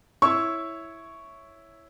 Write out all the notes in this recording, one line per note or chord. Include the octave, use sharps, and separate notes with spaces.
E4 C#5 C#6 E6